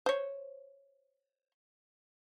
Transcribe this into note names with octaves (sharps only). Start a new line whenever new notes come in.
C5 C#5